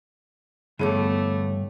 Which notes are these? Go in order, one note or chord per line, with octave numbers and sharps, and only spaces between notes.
G2 D3 E3 A3 B3 C#5 D6